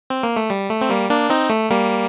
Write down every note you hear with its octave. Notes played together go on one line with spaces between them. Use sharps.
C4
A#3
A3
G3
A3
C4
G3 A#3
A#3 D4
C4 D#4
A3
G3 A#3